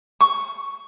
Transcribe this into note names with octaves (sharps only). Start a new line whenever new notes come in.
C#6